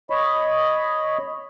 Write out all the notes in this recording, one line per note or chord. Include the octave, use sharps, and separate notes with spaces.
C#5 D#5 B5